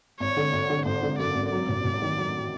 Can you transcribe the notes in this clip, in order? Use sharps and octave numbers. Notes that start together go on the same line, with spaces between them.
G#1 C#5
D3
G#1
D3
G#1 C5
D3
F#2 D5
G#1
F#3 D5
A1
A1
D#3
F#3